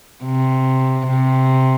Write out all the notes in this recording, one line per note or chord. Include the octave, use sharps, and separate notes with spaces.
C3
C3